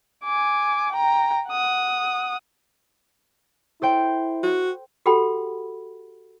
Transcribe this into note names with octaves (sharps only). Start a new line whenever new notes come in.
G#5 D6
G5 A#5
F#5 D#6
E4 A4 C5 G5
F#4
F#4 G4 A4 F#5 G5 B5